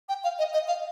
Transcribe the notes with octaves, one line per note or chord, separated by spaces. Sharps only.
G5
F5
D#5
D#5
F5